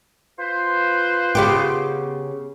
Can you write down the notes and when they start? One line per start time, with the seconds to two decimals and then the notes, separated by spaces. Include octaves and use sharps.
0.39 F4 B4 C5
1.35 C#3 B3 G4